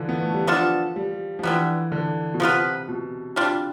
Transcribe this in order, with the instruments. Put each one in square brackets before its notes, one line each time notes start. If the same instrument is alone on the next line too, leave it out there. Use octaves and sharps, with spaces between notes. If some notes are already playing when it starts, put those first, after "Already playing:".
Already playing: [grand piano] D3 E3 F3
B3
A3
G3
[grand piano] F3 [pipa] B3 D4 F4 A4
[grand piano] G3
F3
[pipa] D3 G3 B3 [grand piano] E3
[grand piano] D3
B2
[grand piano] C3 [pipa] F3 B3 F4 B4
[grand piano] B2
[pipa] G3 D4 F4